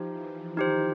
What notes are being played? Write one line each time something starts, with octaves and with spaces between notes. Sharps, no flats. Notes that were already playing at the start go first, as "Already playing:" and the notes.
Already playing: F3 D#4 G4 C5
E3
D#3 D#4 G4 C5